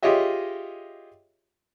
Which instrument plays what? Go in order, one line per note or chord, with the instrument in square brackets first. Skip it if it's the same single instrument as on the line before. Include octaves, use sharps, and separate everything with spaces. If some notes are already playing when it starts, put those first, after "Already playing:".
[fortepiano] F4 G4 G#4 C#5 D#5 E5